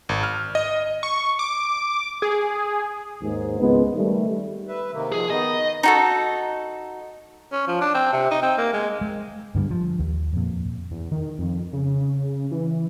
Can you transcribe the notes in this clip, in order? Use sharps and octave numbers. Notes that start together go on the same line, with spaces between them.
G#1
F6
D#5
C#6
D6
G#4
D#2 G#2
G#1 C#2 G#3 B3
D#3 G3 A3
B4 E5
C3 D#3 A#3
D#3 F3 G#4
D#3 B3 D#4 D#5
D#4 F#4 A4
C#4
F3
D4
C4
C3
D#4
C4
A#3
G#3
G#3
G2 D3 E3 G3
F3
D#2
F2 A#2
E2
D#3
F2
C#3
E3